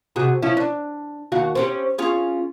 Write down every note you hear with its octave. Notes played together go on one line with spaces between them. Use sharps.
C3 F#4 G#4
F3 C#4 E4
D4
D#2 F#4 F5
C4 C#4 G4
C#4 F4 G#4